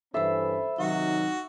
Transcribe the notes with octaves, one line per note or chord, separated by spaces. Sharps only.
G2 E3 C#4 A4 C5 E5 B5
C3 D#3 F#3 D#4 F#4